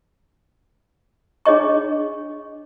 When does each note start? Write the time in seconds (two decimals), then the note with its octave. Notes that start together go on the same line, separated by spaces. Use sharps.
1.45 D4 G#4 C#5 D#5 C#6